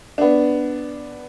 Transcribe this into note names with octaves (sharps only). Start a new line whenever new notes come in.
B3 D4